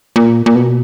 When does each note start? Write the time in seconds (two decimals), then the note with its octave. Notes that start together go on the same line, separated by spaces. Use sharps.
0.16 A#2
0.46 A#2
0.55 B2